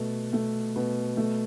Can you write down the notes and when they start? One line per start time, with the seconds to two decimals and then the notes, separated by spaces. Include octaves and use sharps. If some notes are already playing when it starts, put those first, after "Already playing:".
Already playing: B2 A3
0.33 A3
0.76 B2
1.17 A3